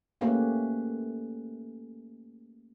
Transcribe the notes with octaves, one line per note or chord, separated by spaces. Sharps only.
A3 A#3 C#4 G4 B4